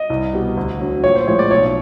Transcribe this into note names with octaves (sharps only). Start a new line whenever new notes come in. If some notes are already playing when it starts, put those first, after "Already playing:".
Already playing: D#5
C2
B2 G3
D2
D3 F#3
A#1 C#5
C5
A2 F3 G#3 C#5
D5
B1 C#5